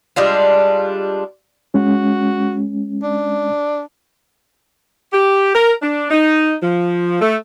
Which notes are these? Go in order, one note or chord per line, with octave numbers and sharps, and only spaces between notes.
G3 G#3 D4 F4
G#3 C#4 F#4
D4
G4
A#4
D4
D#4
F3
A3